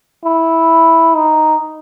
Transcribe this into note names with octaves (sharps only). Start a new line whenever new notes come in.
E4
D#4